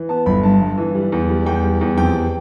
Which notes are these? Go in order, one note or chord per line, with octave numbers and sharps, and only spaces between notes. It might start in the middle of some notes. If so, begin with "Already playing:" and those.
Already playing: E3
B3 A5
G1 B5
G2 A5
G2
E3
G3
E2
G3
E2 G5
G3
E2
F2 G5